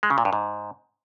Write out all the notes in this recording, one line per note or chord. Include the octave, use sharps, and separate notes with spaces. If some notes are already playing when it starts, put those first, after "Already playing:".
G#3
C#3
A#2
G2
G#2